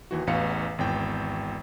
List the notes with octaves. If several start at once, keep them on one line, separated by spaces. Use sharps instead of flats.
D#2 E3 F#4
A1 E2 B3 F5 C#7
G#1 E2 G5